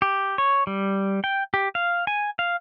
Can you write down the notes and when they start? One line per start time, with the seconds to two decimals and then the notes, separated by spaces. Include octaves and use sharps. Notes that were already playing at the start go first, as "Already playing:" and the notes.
0.02 G4
0.38 C#5
0.67 G3
1.24 G5
1.54 G4
1.75 F5
2.07 G#5
2.39 F5